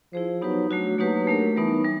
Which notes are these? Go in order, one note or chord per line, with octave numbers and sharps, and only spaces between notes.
F3 E4 G#4 C5
F#3 B3 D#4 G4 B4
F#3 A3 D4 F#4
F#3 A#3 D#4 G4 B4
A3 D4 G4 A#4
E3 G3 B3 D#4
G3